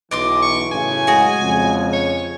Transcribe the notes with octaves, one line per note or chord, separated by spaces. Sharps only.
B1 E3 D5 D#5 C6 D6
C#6
F#2 A2 C#3 G#5
G#3 F#4 G#4
F2 C#3
C#5